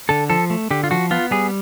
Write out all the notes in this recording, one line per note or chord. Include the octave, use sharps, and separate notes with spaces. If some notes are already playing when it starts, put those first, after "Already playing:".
D3 A4
F3 A4
A3
D3 G4
F4
F3 F#4
B3 F4
G3 G#4